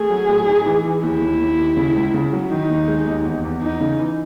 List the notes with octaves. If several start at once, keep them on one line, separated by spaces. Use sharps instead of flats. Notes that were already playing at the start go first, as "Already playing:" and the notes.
Already playing: A3 G#4
F#3
A2
D#4
E3
E3
D#2 E4
D#2
D#2
D#2
C#3
C#2
C#3
F#3
D#3 D#4
D#2
G#3
D#2
E2
E2
E2 D#4
C#3
E3